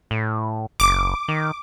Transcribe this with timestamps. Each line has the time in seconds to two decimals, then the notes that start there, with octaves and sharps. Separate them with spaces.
0.11 A2
0.80 F#1 D6
1.28 D#3